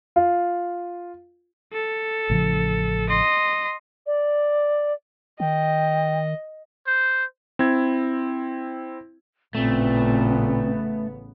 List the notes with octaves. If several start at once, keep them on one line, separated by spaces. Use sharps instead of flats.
F4
A4
A1 C#3 F3
D#5 C6
D5
D#3 D#5 G5
C5
C4 E4 G#6
A1 A#2 C#3 A3 B3 C4